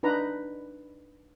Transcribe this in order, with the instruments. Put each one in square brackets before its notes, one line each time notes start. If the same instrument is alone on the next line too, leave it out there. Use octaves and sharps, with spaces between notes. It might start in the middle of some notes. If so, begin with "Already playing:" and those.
[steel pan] D4 D#4 B4 A#5